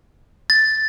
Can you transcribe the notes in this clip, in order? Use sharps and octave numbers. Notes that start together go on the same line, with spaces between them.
A6